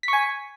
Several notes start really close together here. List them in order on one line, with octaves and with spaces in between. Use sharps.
B6 C#6 G#5